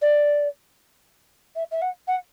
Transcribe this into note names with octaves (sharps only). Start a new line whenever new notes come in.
D5
E5
E5
F#5
F#5